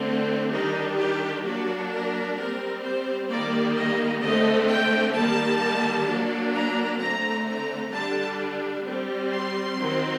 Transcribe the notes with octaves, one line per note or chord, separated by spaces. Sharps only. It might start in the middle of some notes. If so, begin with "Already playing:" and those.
Already playing: D3 A3 C4
D#3 G3 D4 D#4
G4
F#3 A#3 D4 F#4
A#4
G3 C4 A#4
C5
D#3 G3 A#3 D5
D#5
D3 A3 C4 D#5
G5
D#3 G3 A#3 A5
F#3 A#3 D4
A#5
D3 A3 C4 A#5
A#5
D3 G3 D4 A5
G3 C4
C6
D#3 F#3 C4